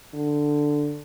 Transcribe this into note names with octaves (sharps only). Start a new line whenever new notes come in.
D3